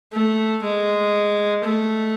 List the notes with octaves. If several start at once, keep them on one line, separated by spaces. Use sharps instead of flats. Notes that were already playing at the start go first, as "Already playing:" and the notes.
A3
G#3
A3